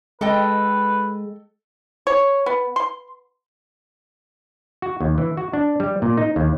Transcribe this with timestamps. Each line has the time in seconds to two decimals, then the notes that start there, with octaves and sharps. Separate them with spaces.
0.21 G#3 A4 B4 D#5 G5
2.07 C#5
2.46 B3
2.76 C6
4.82 F#4
5.01 D#2
5.18 E3
5.37 F#4
5.53 D4
5.80 G3
6.02 A#2
6.17 D#4
6.36 D#2